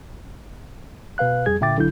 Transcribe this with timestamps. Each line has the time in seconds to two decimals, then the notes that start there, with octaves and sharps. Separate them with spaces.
1.18 B2 B4 F5 F#6
1.46 F2 G3 G#4 G#6
1.61 A#2 D3 E5 G5 D6 A6
1.77 B1 D3 F#3 E4 G6